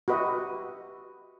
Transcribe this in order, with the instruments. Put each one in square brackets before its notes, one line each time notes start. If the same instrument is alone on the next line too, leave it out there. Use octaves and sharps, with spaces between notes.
[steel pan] F#4 G4 B4 D#5 E5